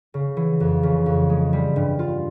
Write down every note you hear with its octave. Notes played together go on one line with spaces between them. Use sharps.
C#3
E3
F2
C#3
F2
G#3
G3
G2
F4